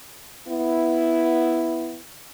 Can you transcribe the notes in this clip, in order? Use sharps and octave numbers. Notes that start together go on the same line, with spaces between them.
B3 E4